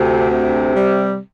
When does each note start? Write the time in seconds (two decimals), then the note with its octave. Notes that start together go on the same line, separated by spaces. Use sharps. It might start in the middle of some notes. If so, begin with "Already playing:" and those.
Already playing: D2 C3
0.31 C3
0.75 G3